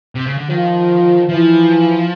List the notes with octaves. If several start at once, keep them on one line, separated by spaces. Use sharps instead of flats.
C3
C#3
D3
D#3 F3
E3 F3